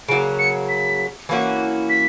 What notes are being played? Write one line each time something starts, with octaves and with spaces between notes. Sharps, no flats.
C#3 F#3 A#3 D7
C#7
B6
E3 A#3 C#4 F#4
B6